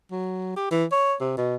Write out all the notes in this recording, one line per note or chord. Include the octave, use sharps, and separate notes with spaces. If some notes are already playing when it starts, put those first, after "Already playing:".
F#3
G4
E3
C#5
C3
B2